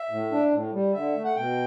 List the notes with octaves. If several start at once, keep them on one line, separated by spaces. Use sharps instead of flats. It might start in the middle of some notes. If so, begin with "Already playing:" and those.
Already playing: E5
A2
D4
A2
G3
D3 E5
A3
F#5
B2 G5